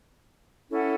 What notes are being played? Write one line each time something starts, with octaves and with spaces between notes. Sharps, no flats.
C#4 E4 A4 F#5